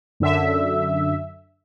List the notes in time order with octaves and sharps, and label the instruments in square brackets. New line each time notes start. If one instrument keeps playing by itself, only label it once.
[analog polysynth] F#2 D3 E5